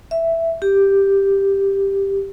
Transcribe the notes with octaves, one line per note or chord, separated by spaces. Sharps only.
E5
G4